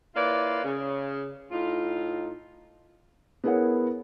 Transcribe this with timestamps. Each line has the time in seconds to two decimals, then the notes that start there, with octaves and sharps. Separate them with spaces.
0.15 A#3 E4 F4 B4 C#5 D5
0.64 C#3
1.51 A2 D#4 F4
3.44 B3 E4 G#4 A#4 C#5 F#5